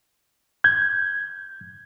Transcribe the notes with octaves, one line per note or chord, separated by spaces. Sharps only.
G6 G#6